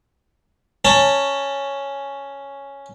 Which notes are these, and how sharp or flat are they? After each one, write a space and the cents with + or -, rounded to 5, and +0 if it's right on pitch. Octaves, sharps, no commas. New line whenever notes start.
C#4 +0 A5 +15